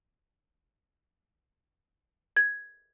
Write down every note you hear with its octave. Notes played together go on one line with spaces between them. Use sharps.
G#6